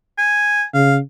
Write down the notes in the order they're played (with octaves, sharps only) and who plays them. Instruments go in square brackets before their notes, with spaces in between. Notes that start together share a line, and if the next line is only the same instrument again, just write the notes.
[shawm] G#5
[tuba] C#3 [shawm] F5